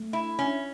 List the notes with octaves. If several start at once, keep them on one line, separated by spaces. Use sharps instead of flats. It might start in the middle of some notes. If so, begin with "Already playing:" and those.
Already playing: A3
E4
C#4